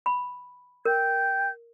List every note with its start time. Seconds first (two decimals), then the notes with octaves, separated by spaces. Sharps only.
0.06 B5
0.85 A#4 G5 G6 G#6